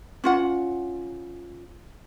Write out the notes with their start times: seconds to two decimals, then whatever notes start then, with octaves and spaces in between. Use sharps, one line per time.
0.24 C#4 F4 F#5